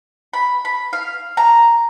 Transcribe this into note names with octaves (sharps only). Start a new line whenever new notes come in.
B5
B5
F5
A#5